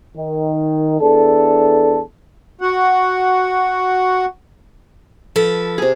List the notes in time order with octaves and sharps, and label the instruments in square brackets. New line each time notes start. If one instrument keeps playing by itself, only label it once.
[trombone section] D#3
E2 D4 A4
[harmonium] F#4 F#5
[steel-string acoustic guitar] F3 A4 B4
[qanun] C3 G#4